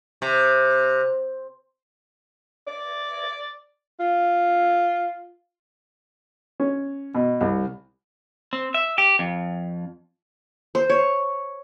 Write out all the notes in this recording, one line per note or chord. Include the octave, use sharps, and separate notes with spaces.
C3
D5
F4
C#4
B2
C2
C4
E5
G4
F2
C5
C#5